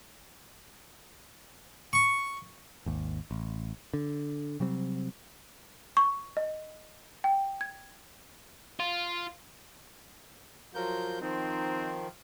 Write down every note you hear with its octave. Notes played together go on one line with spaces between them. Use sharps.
C#6
G#1 D#2
A1
D3
C3 F#3 G3 C4
C#6
D#5
G5
G#6
F4
F3 F#3 F4 A#4 G6
D#3 F3 C4 D#4